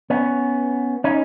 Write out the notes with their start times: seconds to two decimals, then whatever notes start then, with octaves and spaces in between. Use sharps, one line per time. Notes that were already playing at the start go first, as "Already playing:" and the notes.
0.10 B3 C#4
1.04 C#4 D#4